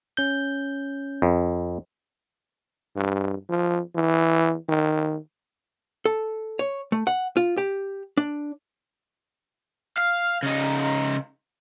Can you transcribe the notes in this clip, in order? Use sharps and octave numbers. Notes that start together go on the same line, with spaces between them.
C#4 G6
F2
G2
F3
E3
D#3
A4
C#5
A3
F#5
F4
G4
D4
F5
C#3 D#4